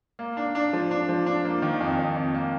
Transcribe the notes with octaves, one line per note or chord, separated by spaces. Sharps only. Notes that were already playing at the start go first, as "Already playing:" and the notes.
A#3
D4
D4
F3
D4
F3
D4
A#3
D#3
F2
F2
F2
A#3